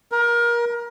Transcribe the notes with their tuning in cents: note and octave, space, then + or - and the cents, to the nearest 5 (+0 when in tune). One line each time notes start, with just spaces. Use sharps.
A#4 +25